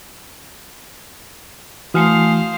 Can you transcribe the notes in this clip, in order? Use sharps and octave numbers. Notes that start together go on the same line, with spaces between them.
E3 A3 F#4 C5 F5 G#5 D#6 F6